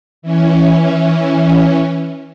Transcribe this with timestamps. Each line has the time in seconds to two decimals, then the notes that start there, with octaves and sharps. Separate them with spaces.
0.22 E3 C#4